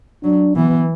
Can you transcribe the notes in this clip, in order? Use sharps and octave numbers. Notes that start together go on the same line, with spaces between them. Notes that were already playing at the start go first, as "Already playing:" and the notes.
F#3 D4
E3 B3